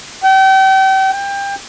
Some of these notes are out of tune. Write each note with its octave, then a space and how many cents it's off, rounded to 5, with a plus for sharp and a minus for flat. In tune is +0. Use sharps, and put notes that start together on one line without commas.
G5 -35
G5 +25